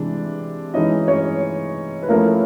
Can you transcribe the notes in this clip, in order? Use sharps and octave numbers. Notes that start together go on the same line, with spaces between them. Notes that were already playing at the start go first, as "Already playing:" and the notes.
Already playing: C3 E3 G#3 D4
E3 G#3 C#4 D#4 E4 D#5
C#4 C#5
B4
F3 A3 A#3 C#4 E4 A#4